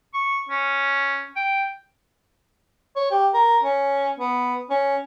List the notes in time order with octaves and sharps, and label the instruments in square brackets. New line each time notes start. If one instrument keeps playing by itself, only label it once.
[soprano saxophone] C#6
C#4
G5
C#5
G4
A#4
C#4
B3
C#4